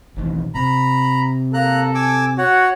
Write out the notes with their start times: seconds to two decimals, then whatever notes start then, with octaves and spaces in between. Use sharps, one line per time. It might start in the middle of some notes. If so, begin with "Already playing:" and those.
0.16 B1 D#3 E3
0.55 C3 A#5 B5
1.54 A#3 A4 A#5 F#6
1.95 G#5 D6 E6
2.38 F#4 C#5 F#5